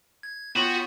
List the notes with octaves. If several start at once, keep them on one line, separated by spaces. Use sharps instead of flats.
G#6
B3 F4 F#4 C#5 G5 B5